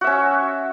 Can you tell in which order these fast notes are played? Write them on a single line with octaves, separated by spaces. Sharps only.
F#4 E5 C#4